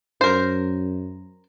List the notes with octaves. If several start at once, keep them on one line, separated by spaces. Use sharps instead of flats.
F#2 A#4 C5